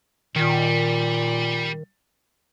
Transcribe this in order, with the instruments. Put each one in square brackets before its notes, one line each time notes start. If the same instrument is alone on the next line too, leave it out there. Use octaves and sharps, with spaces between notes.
[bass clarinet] A#2 [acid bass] D#3 [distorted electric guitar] G3